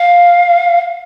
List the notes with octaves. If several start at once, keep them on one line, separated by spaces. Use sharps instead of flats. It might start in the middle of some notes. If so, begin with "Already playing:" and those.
Already playing: F5